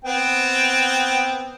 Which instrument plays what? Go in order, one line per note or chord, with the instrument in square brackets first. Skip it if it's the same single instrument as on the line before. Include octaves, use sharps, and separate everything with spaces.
[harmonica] B3 C4 G5